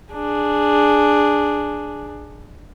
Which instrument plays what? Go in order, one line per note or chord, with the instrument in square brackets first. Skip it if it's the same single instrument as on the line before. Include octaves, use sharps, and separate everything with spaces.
[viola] D4 G#4